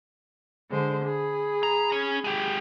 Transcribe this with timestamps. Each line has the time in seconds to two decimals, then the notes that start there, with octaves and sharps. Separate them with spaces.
0.71 D3 G#3 C5
1.05 G#4 B5
1.63 A#5
1.92 C#4
2.24 G#3 G4